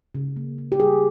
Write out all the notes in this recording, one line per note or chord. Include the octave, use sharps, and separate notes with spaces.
C#3
A#3
C#3
G4
G3 G#4